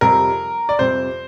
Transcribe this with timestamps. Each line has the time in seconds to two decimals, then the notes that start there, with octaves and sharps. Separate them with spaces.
0.01 F2 C3 G3 A#4
0.69 D5
0.79 F2 C3 G3 C5